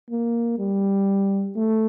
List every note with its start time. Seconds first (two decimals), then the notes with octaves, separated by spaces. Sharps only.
0.10 A#3
0.58 G3
1.56 A3